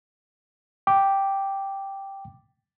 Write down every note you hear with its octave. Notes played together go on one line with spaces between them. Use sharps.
G5 D6